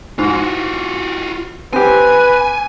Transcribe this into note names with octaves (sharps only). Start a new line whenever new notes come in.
G#2 F4 F#4
C4 G4 B4 G#5